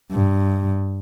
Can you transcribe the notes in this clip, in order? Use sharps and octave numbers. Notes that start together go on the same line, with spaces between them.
G2